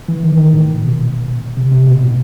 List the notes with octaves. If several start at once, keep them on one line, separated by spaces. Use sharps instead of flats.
E3
D#3
D#3
A2
A#2
B2
C3
C3
B2
A2